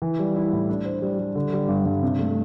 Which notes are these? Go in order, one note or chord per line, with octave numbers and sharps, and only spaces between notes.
E3
G3
E4
A2
D4
C5
G3
G3
D3
G3
G2
G2
C3
A3